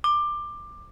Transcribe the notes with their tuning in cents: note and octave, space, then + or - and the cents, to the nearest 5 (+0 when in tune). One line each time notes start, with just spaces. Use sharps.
D6 +20